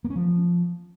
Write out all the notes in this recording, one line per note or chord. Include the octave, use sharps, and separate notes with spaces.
A#3
C#4
F3